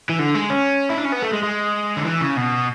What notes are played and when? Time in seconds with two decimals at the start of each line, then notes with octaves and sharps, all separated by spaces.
0.09 E3
0.19 D3
0.35 G#3
0.50 C#4
0.90 E4
0.98 D4
1.05 C#4
1.13 B3
1.23 A3
1.33 G#3
1.43 G#3
1.96 D3
2.05 E3
2.21 C#3
2.37 B2